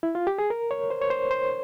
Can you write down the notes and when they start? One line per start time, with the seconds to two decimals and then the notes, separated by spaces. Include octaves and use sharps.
0.03 E4
0.15 F4
0.27 G4
0.38 G#4
0.50 A#4
0.71 C#5
0.90 C5
1.02 C#5
1.10 C5
1.31 C5